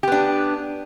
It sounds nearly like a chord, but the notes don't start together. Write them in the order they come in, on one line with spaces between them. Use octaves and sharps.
G4 B3 D4